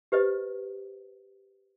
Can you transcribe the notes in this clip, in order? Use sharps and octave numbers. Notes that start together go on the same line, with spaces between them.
G4 B4 C5 D#5